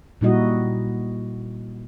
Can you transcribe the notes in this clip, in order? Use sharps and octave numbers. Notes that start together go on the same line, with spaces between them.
A#2 G3 D#4 E4 F#4 D#5